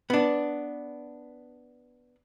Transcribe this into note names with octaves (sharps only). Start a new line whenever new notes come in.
B3 D4